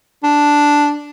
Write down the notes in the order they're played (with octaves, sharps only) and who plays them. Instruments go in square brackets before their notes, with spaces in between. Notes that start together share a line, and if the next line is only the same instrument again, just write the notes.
[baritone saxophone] D4